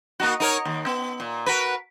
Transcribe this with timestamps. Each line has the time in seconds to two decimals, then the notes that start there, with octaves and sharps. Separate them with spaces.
0.20 A#3 D#4 F#4
0.40 D#4 A#4 C#5
0.65 D#2
0.86 B3
1.20 A#2
1.46 F#4 A#4 B4